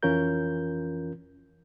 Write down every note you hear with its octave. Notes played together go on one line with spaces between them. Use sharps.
F2 E3 C#4 F4 A#4 G6